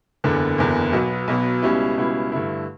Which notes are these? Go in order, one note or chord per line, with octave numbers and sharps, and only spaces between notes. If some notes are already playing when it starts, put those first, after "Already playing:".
F#1 E2 D3
F#1 E2 D3
B1 B2 F#3 B3
B1 B2 F#3 B3
C#2 B2 G3 C#4 E4
C#2 B2 G3 C#4 E4
G2 D3 A3 E4